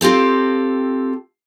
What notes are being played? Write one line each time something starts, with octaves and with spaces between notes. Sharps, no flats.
C4 F4 G4 A4